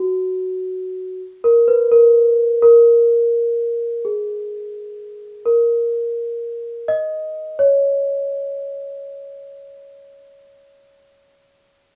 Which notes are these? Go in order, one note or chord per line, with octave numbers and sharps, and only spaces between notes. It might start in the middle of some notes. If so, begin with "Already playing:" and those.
Already playing: F#4
A#4
B4
A#4
A#4
G#4
A#4
D#5
C#5